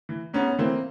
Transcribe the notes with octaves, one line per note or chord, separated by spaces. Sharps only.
E3
G#2 B3 C#4
E3 A#3 C4